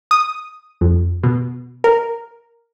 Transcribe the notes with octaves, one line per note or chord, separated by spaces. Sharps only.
D#6
F2
B2
A#4